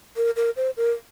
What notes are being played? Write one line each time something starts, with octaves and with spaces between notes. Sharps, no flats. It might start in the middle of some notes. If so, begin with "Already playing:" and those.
A#4
A#4
C5
A#4